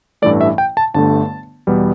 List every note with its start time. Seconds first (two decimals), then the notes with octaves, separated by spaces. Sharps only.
0.22 A1 G2 E3 A3 D5
0.41 E5
0.58 G5
0.77 A5
0.94 G1 G2 D3 A3 A5
1.67 E2 B2 G3 B3